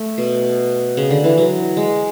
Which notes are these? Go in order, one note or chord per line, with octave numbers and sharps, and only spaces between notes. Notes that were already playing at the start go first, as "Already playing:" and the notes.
Already playing: A3
B2
C#3
D3
E3
F#3
G#3